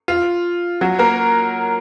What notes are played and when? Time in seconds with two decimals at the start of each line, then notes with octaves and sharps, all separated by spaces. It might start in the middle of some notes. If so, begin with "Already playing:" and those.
0.08 F4
0.81 F#3 F#4
0.99 A#3 A#4